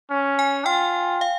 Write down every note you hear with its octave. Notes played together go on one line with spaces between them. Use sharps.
C#4
G#5
F4 G5
F5